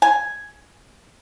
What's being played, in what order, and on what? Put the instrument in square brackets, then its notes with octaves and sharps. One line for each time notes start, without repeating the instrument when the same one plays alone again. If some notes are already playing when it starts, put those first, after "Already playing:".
[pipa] G#5